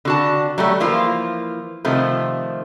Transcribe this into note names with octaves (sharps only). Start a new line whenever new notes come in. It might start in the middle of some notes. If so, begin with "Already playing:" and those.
D3 F#4 A5
F#3 G3 A3
E3 F3 A#3 F4
C3 D#3 F3 A3